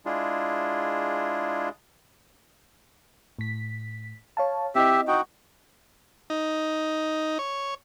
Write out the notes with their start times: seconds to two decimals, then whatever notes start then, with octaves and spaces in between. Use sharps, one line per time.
0.06 G#3 D4 E4 F4 G#4
3.39 A2 B6
4.37 C#5 F5 A5
4.75 C4 E4 G4 D#5 E5
5.08 D#4 F#4 G5
6.30 D#4
7.39 C#5